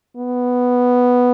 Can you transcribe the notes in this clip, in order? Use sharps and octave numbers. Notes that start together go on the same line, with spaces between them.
B3